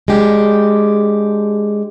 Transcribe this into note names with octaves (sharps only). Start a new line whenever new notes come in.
G#3 D4 G4